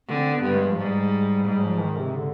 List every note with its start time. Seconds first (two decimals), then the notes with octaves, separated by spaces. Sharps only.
0.08 D3 C4
0.31 B3
0.42 G2
0.54 G#3
0.66 F3
0.77 G#2 G3
1.46 G#2 G3
1.63 F3
1.81 D#3
1.98 C3
2.16 D3